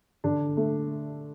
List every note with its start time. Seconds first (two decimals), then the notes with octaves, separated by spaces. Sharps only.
0.24 D3 D4
0.57 A3